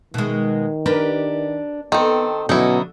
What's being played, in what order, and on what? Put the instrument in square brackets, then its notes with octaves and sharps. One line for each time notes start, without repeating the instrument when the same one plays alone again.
[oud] B2 G#3 [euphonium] D#3
[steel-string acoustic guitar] D4 [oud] G4 A#4 B4
[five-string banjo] D#3 C4 [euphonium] B3 [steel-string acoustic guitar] A4
[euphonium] B2 [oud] D3 [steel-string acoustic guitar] F#3 C#4 [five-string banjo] D#4 E4